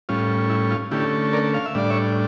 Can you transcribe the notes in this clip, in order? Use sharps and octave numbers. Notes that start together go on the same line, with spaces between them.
A2 G3 C#4 F4
E4
F4
D3 A3 C#4 E4 G4
A#4 D5
F5
E5
A2 G3 D4 D5
C#5 E5